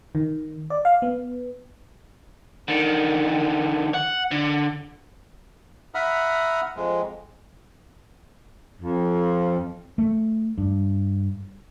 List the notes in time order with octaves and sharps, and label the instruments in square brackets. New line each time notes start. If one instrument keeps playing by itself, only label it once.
[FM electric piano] D#3
D5
F5
B3
[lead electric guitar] D3 D#3
F#5
D3
[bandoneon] E5 F#5 A#5 B5 D#6 F6
F2 G#3
[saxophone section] F2
[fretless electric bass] A3
G2